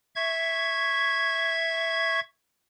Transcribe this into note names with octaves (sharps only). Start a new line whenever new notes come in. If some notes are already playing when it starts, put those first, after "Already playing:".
E5 C#6 G#6